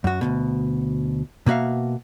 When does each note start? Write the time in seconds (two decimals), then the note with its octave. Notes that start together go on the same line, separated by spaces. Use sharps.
0.04 F#2 F#4
0.21 D2 G#2 B2
1.46 B2 A#3 F#4 E5 F5